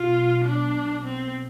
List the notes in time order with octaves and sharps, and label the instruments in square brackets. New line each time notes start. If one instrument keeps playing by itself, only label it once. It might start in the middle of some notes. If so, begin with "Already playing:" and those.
Already playing: [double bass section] B1 B2 [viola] F4
[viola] D4
C4